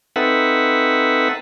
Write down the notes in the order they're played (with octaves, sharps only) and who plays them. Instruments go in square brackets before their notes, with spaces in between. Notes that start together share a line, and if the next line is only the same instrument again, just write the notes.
[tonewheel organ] C4 D#4 A4 B4 E5 F#5